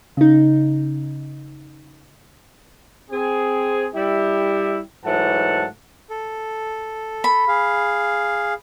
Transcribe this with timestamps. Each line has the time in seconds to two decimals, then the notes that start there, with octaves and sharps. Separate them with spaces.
0.17 C#3 D#4
3.11 C4 G#4
3.93 G3 E4 G4
5.04 G#2 E3 F#3 A3 F#5 A5
6.10 A4
7.24 B5
7.48 G#4 F5